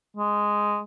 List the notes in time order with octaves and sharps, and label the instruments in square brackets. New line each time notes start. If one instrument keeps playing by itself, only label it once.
[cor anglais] G#3